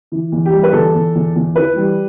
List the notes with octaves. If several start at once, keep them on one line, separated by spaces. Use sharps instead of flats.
E3
E2
G4
G3
B4
E2 A4
E2
E2
E2
E3 B4
G3